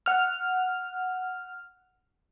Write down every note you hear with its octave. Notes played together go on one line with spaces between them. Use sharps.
F#5 F6